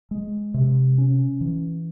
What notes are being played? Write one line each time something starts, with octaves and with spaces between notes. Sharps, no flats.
G#3
C3
C#4
E3